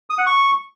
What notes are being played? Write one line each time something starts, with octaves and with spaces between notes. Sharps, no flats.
D#6
F#5
C#6